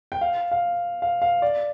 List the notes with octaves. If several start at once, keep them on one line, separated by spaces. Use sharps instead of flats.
G5
F5
F5
F5
F5
D5